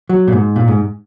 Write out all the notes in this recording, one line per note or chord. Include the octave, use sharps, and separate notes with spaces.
F#3
A#2
G#2
A#2
G#2